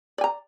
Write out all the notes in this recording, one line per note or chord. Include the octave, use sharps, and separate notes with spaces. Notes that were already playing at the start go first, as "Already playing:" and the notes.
D5 G#5 A#5